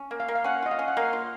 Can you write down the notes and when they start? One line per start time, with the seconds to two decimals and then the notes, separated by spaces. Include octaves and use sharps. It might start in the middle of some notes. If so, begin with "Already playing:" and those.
Already playing: C#4
0.11 A#3
0.20 F5
0.28 A#3
0.35 F5
0.44 C#4 F#5
0.62 F4 D#5
0.71 F5
0.79 C#4
0.88 F#5
0.97 A#3 F5
1.13 F4